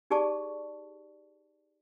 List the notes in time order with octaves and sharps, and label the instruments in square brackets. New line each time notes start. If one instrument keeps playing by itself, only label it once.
[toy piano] D#4 G4 G#4 D5 A5 C#6